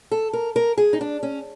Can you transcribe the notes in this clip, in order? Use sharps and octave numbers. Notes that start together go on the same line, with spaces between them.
A4
A#4
A#4
G#4
D#4
D4
C#4